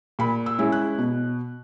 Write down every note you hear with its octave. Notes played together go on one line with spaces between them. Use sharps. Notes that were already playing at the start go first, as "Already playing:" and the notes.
A#2 B5
E6
G#3 C#4 E4
F#6
B2